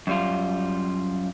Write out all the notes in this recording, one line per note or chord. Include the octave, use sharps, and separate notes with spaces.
F#2 G3 F4